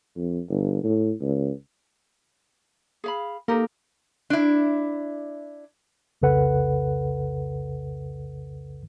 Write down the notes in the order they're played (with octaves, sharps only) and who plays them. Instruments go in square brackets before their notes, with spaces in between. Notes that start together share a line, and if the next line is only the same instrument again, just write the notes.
[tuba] F2
G1
A2
C#2
[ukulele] G#4 F5 B5
[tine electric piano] A#3 A4 [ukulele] D#4 G4 A#4
[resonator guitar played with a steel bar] D4 E4
[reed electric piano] C2 F2 C#3 A4 B4 F#5